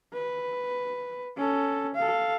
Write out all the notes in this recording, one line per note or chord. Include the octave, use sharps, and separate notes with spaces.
B4
C#4 A4
A4 F5